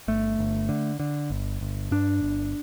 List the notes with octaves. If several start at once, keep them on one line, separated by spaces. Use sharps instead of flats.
G1 A3
G1
D3
D3
G1
G1
G2 D4
G1